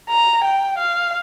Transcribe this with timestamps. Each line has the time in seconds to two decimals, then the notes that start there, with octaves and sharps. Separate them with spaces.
0.10 A#5
0.44 G5
0.78 F5